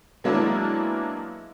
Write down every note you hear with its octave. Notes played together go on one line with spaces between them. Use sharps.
F#3 G#3 A#3 B3 D4 E4